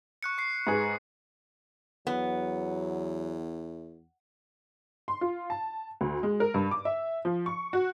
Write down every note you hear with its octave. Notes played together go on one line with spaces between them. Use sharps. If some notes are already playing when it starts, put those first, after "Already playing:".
C#6 F#6 C#7
C#6 C7
G#2 G#4 B4
E2 F#3 B3
C6
F4
A5
D2
G#3
A#4
G2
D6
E5
F3
C#6
F#4